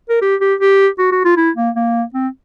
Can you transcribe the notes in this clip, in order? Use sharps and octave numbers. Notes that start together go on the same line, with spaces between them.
A#4
G4
G4
G4
F#4
F#4
F4
E4
A#3
A#3
C4